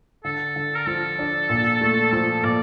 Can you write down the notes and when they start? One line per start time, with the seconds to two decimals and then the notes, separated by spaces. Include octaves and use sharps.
0.25 D3 A4
0.56 D3
0.76 A#4
0.87 F3 A4
1.19 D4
1.50 A#2
1.81 A3
2.13 F3 A4
2.44 A#2 D5